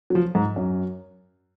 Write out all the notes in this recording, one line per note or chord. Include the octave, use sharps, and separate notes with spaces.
F#3
F3
G#2
F#2